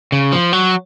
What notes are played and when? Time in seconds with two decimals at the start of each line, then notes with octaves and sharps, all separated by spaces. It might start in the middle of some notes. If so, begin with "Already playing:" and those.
0.12 C#3
0.32 F3
0.53 F#3